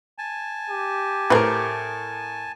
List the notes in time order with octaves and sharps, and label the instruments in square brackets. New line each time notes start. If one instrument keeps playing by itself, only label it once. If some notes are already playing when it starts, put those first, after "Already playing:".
[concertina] G#5 A5
[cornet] G4
[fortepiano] A2 A#4 [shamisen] C4 B4